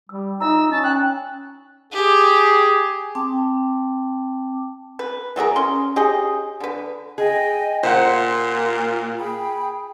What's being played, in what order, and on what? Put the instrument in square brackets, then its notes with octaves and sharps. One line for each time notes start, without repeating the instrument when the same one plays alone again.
[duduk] G3 [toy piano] E6
[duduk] D#4 [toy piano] F4 E5 A#5 [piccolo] E6
[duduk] C#4 [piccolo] A5
[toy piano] F5 G5 [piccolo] F#6
[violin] G4 [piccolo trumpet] G#4
[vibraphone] C4 G5 A5 D6
[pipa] B4
E3 F#3 G#4 A#4
C#4 C6
G4 G#4 C#5 D#5
D3 B4
[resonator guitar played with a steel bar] G#4 [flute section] D#5 G5 G#5
[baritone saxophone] A#2 [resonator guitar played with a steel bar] C5 F#5 [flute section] C6
[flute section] G#4 G5 B5